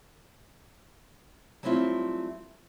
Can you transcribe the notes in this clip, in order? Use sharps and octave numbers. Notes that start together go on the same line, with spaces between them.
F#3 G3 A3 C4 E4 F4